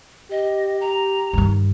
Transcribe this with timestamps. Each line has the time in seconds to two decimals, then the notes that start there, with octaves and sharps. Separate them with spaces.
0.31 G4 D#5
0.81 A#5
1.33 G2 D#3